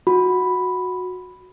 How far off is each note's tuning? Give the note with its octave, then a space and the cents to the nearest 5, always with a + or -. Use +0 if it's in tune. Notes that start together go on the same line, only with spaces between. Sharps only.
F#4 -10 B5 +0